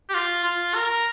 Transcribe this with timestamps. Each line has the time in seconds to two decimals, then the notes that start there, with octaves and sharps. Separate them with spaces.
0.09 G4
0.14 F4
0.44 F4
0.75 A#4